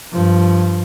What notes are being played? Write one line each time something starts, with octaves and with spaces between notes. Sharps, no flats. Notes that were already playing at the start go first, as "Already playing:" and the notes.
G2 F3